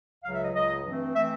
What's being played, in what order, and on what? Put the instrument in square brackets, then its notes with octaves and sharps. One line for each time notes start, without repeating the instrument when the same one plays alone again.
[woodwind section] C#2 C#3 F#3 F5
E5
D#5
C#2 C#3 F#3 D#5
G2 E3 A3 C4
E3 A3 C4 E5